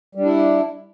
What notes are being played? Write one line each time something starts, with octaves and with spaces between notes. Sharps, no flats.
G3 D4 E4